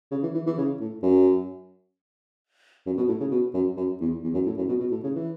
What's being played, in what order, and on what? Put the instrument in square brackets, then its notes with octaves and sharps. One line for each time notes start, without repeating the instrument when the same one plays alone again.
[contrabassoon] C#3
E3
E3
E3
C#3
A2
F#2
F#2
B2
A2
C#3
B2
F#2
F#2
E2
E2
F#2
A2
F#2
B2
B2
A2
C#3
E3